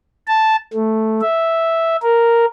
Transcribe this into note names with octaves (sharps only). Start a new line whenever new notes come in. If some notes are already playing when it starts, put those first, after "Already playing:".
A5
A3
E5
A#4